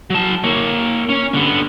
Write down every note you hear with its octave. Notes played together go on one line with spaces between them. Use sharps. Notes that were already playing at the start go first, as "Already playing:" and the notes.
F#3 A5
A#3 C#5
C#4
D3 B3